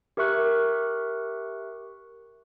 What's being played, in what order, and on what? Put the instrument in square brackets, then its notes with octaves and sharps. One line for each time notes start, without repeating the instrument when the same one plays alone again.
[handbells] G4 A#4 E5 C#6 F#6